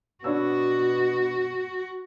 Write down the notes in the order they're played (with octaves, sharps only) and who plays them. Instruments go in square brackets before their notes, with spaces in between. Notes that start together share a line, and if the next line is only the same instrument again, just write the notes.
[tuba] B2 [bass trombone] B3 [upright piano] D4 C#5 E6 [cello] F#4